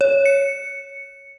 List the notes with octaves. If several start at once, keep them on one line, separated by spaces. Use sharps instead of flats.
C#5
C#7